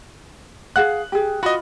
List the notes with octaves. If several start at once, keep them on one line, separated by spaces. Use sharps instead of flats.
G#4 F5 F#5 F#6
G4 G#4
F4 F#4 D#5 B5